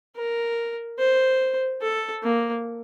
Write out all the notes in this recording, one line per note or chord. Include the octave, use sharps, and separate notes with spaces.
A#4
C5
A4
A#3